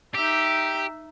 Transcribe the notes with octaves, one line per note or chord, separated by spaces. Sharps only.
D#4 G4 E5